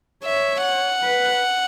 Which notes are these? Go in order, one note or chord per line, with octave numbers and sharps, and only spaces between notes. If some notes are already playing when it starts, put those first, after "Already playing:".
C#5 E5
F#5
B4